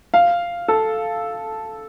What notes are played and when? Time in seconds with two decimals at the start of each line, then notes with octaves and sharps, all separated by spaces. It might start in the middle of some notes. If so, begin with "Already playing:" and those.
0.14 F5
0.68 A4